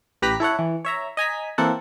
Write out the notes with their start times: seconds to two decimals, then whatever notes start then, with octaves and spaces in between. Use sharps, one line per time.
0.22 A1 G4 B4 A#5 F#6 B6
0.40 E4 A4 C#5 F#5
0.59 E3
0.85 C#5 E5 A#5
1.17 D#5 G#5 A#5 B6
1.58 E3 A#3 C4 A4 F#5